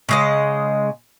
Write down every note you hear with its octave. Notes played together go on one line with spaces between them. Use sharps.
C#3 G#3 D#5